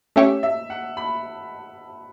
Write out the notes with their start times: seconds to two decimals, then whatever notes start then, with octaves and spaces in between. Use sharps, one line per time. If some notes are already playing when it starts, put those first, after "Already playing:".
0.16 A3 C#4 G4 C#5 E5
0.43 E5
0.70 F#5
0.97 B5